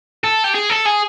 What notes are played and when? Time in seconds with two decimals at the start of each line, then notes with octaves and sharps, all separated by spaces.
0.24 A4
0.44 G4
0.55 G#4
0.70 A4
0.86 G#4